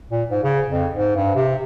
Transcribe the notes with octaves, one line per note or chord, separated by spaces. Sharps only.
A#2
G#2
C#3
F2
G#2
G2
C3